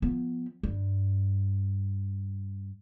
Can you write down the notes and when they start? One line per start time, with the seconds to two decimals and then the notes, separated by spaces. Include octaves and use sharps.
0.02 F3 B3
0.63 G2